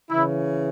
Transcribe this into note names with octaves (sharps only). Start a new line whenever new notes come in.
C#3 E3 E4